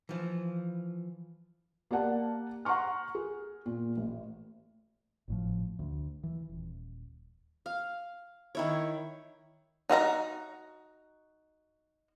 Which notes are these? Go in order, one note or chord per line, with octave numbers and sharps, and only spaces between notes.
E3 F3
A#3 G4 D5 F#5 A5
F#5 A#5 C6 C#6 F6
G#4
A#2
A1
G#1 A2 F3
D2
E3
D#1
F5
D#3 E4 C#5
D#4 F#4 E5 A#5